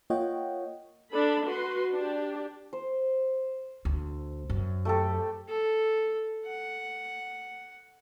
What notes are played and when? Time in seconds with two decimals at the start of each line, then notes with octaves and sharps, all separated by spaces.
0.10 A#3 F4 C#5 D#5 F#5 G5
1.11 D4 A4 B5
1.45 F#4 B4 C6
1.93 D4 G4
2.73 C5
3.85 D2
4.50 F#2
4.85 A3 G4 A4
5.48 A4
6.46 F#5